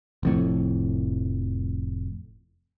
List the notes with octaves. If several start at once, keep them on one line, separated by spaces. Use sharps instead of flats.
F1 F2 A2